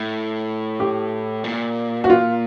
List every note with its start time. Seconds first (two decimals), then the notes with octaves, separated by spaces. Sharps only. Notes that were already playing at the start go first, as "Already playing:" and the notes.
Already playing: A2
0.80 G4
1.44 A#2
2.04 F#4
2.10 F4